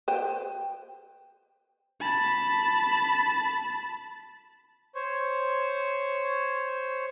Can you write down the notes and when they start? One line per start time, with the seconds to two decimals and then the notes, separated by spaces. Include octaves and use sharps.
0.08 B4 C5 G5
2.01 A5 B5
4.95 C5 C#5